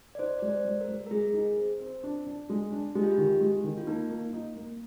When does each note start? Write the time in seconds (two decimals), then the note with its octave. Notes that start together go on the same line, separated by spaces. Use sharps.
0.15 D5
0.19 D#4 C5
0.39 G#3 D5
0.50 C5
0.65 G#3
0.81 A#4
0.88 G#3
1.07 A#4
1.11 G#3 G#4
1.34 D#4
1.57 C4
1.80 C4
2.03 D4
2.27 D4
2.50 G#3
2.72 D4
2.95 G#3 G4
3.03 F4
3.12 G4
3.18 D#3
3.40 G#3
3.64 D#3
3.77 F4
3.87 A#3 D#4
4.10 A#3
4.33 D#4
4.56 A#3